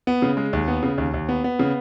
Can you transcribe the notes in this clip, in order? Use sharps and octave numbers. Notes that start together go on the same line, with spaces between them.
B3
C#3
G#3
D#2
B3
C#3
D#2
D#2
B3
B3
C#3